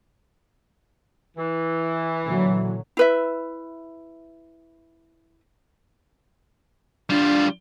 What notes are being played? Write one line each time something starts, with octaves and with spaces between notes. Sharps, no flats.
E3
A#2 D3 F#3
E4 B4 E5
G3 D4 F4